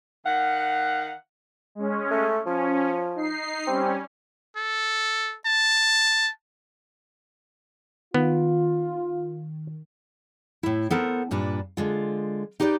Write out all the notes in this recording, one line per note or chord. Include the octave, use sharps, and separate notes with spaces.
D#3 F5 F#5
G#3 C#4
A3
F3 C#4
D#4 C7
G3 C4 C#4
A4
A5
D#3 B3 F4
A2 E4
B3 A4 A#4 C5
G2 A#2 D4 B4
D3 G#3 F4
D#4 G4 B4 C5 D5